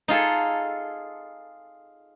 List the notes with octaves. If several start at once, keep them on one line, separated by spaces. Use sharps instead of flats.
D#4 F4 G#4 A4